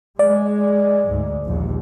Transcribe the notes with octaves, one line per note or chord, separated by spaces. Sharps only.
G#3 D5
D2 G#2
A#1 D#2